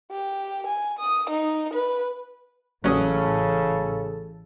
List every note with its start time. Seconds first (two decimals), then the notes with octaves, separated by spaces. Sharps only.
0.11 G4
0.66 G#5
0.99 D#6
1.30 D#4
1.74 B4
2.84 A1 C#3 F#3 C#4 A4 D#6